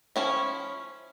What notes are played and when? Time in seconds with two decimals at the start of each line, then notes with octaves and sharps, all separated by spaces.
0.16 F3 C#4 E4